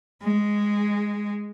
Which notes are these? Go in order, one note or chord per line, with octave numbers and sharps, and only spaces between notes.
G#3